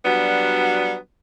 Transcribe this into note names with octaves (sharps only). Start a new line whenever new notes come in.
F#3 G3 B3 D4 F#4